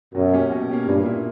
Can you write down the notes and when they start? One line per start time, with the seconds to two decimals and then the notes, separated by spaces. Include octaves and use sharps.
0.14 F#2 B2
0.33 A#3 C#4 G4
0.51 B2
0.69 A#3 C#4 G4
0.87 G2 A#2
1.05 A#3 E4